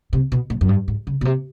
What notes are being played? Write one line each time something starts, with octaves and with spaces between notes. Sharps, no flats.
C3
B2
A2
F#2
G2
G#2
C#3
B2
C3